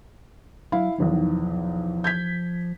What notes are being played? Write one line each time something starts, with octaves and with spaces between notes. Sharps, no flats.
F#3 E4 F5
B1 E2 D#3 F3
G6 G#6 B6